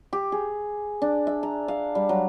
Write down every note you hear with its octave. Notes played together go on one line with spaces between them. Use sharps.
G4
G#4
D4
E5
A#5
F5
G3
F#3